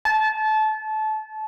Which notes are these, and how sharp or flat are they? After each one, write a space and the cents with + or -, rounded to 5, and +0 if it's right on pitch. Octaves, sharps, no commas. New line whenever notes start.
A5 -25